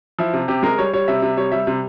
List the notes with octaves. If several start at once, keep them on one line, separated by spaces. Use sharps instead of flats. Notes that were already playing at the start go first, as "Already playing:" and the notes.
F3 E4
C3
C3 G4
G#3 A#4
G3 C#5
G3 C#5
C3 E5
C3
G3 C#5
G3 E5
C3